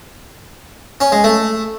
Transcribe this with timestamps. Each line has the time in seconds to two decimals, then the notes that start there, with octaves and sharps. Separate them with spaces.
1.01 C#4
1.12 G#3
1.24 A3